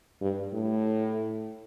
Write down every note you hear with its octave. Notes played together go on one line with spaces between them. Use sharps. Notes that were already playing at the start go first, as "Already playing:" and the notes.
G2
A2